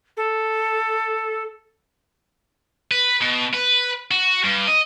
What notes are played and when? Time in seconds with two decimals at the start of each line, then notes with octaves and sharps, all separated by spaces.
0.17 A4
2.91 B4
3.21 B2
3.54 B4
4.11 F#4
4.44 G2
4.67 D#5